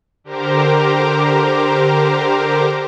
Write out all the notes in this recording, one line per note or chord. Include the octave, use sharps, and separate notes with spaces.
D3 G4 A#4 C5 A#5 D6